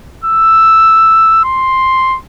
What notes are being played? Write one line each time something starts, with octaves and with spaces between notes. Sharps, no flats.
E6
C6